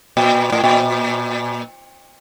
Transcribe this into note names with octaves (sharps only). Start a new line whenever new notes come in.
A#2
A2
A#2